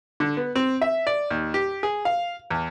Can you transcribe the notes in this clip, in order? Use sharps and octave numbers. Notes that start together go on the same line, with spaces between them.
D3
B3
C4
E5
D5
D#2
G4
G#4
F5
E2